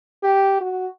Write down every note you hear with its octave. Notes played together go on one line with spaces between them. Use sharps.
G4
F#4